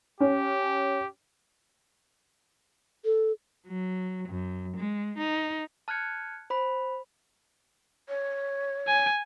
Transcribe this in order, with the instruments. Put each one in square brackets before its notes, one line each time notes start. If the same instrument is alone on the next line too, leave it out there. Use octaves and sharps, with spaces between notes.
[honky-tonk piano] C#4 [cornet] G4
[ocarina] A4
[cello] F#3
F#2
G#3
D#4
[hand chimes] A5 F6 F#6 G#6 C#7
C5 B5
[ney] C#5
[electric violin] G#5